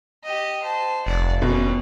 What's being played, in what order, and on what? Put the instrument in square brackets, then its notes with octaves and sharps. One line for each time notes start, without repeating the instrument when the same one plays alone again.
[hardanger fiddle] G4 D#5
C5 A5
[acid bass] F1 [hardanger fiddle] D5 F#5
[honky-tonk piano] B2 [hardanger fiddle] C4 C#4